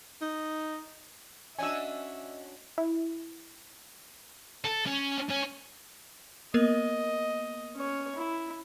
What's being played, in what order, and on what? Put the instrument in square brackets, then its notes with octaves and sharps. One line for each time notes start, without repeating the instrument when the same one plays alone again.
[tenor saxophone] D#4
[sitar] C#4 D4 F#4 [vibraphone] D#5 [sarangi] E5 [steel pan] G#5 E6
[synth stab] E4
[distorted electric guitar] A4
C#4
C#4
[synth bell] A#3 B3 A#4 [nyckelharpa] D#5
[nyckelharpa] C#4 C#5
E4